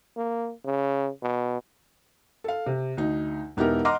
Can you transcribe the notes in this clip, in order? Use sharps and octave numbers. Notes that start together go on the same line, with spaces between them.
A#3
C#3
B2
A4 F5
C3
D2 D#4
E1 B3 D#4 E4 G4 A#4
D#5 F#5 A#5 C6 D6 F6